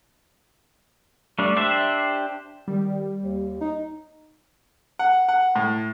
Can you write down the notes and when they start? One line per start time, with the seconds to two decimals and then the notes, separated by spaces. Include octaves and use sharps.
1.39 G3 A3 D4
1.57 D4 G4 C5 E5
2.68 D#3 G3
3.22 D#2
3.61 D#4
4.99 F#5
5.28 F#5
5.55 A2